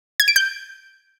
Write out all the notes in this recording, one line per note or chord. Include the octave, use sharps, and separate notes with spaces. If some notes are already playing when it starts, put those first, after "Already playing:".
G#6
D7
G6